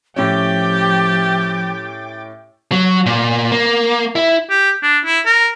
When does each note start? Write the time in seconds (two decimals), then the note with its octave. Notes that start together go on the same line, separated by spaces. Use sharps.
0.16 A2 F3 C#4 G4 G5 D6 A6
2.72 F#3
3.06 A#2
3.52 A#3
4.16 E4
4.50 G4
4.83 D4
5.05 E4
5.26 A#4